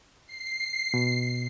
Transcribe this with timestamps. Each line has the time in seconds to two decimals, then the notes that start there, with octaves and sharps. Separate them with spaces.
0.27 C7
0.94 B2